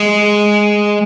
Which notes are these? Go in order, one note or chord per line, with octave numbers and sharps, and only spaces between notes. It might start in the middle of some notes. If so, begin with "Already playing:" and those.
Already playing: G#3